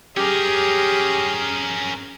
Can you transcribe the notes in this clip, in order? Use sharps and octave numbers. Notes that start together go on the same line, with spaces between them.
C#4 G4 G#4 A#4